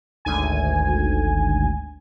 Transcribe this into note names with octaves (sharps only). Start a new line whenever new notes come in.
G#1 D2 G#5